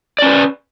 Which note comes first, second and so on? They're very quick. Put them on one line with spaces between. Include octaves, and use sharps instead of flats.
D5 C#4 B4